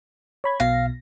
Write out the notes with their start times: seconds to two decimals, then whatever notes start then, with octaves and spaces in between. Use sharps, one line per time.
0.44 C#5 B5 G#6
0.60 B1 B2 F5 A#6